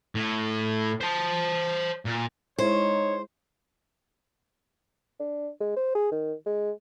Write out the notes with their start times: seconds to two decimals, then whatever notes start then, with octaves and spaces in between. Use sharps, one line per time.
0.15 A2
1.01 C5 A5
2.05 A#2
2.58 G#3 D#4 E4 C5 C#5
5.20 D4
5.61 G#3
5.76 C5
5.95 G#4
6.12 D#3
6.46 G#3